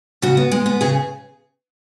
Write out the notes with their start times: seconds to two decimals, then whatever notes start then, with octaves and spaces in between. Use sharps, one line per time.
0.22 C#3 F#4
0.37 B3
0.51 G#3
0.66 B3
0.81 C#3 G#4